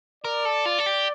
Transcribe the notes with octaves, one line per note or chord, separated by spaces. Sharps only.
A#4 D5
A4
F4
A4
G4